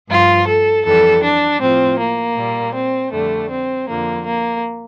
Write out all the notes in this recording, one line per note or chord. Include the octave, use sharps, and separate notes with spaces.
G2 F3 F4
A4
F2 E3 G3 A4
D4
A2 F3 C4
A#3
A#2 G3
C4
F2 D3 G3 A3
C4
F2 D3 F3 A#3
A#3